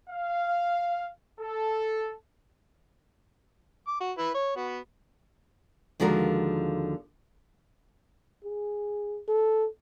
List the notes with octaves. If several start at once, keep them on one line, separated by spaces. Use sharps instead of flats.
F5
A4
D6
F#4
E4 B4
C#5
B3 F#4
D#2 D3 F3 G#3 F#4 A#4
G#4
A4